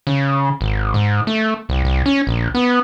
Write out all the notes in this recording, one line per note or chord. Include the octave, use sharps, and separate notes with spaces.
C#3
G#1
G#2
A3
C2
C2
C#4
A#1
B3